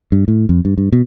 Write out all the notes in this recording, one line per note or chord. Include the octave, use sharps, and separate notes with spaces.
G2
A2
F2
G2
G2
B2